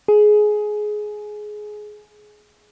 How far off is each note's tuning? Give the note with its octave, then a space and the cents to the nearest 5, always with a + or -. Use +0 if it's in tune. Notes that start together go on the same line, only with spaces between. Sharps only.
G#4 +15